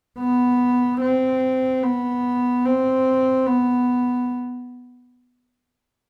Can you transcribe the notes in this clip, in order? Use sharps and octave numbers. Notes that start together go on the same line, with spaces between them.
B3
C4
B3
C4
B3